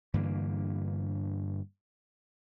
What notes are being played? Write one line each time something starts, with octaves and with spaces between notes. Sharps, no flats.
G2 D3 E3 A#3